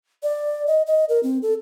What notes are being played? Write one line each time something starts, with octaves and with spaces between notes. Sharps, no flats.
D5
D#5
D#5
A#4
C4
A4